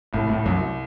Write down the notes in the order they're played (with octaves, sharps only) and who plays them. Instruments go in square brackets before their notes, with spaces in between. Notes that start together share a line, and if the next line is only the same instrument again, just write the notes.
[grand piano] C2 [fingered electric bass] A2
[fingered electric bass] A2
[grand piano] C2 [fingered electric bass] F#2